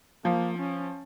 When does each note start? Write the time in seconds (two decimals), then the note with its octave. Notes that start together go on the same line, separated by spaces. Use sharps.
0.24 F3 A#3
0.58 C#4